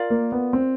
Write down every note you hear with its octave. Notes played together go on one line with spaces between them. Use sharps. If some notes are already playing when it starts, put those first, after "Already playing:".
Already playing: F4 A#4 D5 F5
A#3
B3
C4